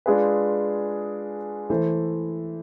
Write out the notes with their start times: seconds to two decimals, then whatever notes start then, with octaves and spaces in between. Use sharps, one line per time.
0.06 G#3 D4 F4 G#4 B4
1.70 E3 A3 E4 A4 C5